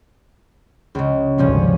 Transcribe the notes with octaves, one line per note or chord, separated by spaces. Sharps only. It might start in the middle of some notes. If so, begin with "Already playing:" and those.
C#2 C#3
G#1 D2 C3 F3 G3 C#4